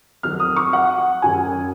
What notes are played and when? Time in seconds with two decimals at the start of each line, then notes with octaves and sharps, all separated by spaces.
0.23 F2 D#3 F#3 F6
0.40 D#6
0.56 C#6
0.73 F#5
1.22 F#2 D#3 F#3 G#5